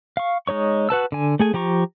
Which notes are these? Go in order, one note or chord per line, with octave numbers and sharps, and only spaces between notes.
F5 C#6
G#3 D#4 C#5 C#6
F#4 B4 A5 E6
D3 G#5
A3 G#4 G#5
F3 G4 A#5 C#6